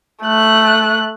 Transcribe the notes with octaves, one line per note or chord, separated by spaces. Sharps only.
A3 F#6